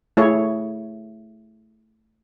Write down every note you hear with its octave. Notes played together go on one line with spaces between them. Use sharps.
A3 E4 G#4 C#5